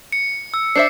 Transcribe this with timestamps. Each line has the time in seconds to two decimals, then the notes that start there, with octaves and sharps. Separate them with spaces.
0.12 C#7
0.54 E6
0.76 D4 C5 E5 D6 C7